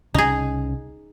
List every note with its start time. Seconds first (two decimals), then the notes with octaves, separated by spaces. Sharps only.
0.14 C2 C#3 C#4 D#4 G#4